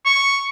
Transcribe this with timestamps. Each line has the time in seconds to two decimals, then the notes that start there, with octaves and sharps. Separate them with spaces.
0.05 C#6